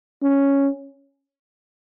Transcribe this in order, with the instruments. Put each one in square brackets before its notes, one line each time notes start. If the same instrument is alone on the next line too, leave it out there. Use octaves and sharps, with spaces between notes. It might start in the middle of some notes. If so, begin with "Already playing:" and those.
[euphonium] C#4